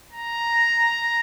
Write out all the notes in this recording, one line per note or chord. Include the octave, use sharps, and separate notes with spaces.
A#5